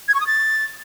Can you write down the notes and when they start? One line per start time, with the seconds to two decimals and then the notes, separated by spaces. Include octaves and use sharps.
0.08 G#6
0.14 C#6
0.21 D#6
0.27 A6